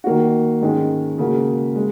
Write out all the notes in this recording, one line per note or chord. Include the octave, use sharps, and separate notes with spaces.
D#3 A#3 F#4
G#2 D#3 G#3 C#4
C#3 A#3 F#4
G#3